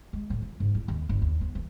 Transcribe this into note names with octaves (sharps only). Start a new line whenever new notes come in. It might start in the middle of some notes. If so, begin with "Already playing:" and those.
G#3
A2
F3
G#2
E4
D#2
G1
D#2
B3
E3